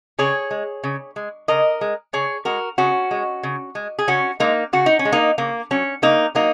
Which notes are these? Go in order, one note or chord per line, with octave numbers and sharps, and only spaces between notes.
C#3 G#4 C#5
G#3
C#3
G#3
C#3 A#4 D#5
G#3
C#3 G#4 C#5
G#3 F#4 A#4
C#3 C#4 F#4
G#3
C#3
G#3
G#4
C#3 C#4 F#4
G#3 A#3 D#4
C#3 F#4
D#4
C#4
G#3
A#3 D#4
C#3 A#3
F#3 C#4
C#3 A#3 D#4
F#3 A#3 D#4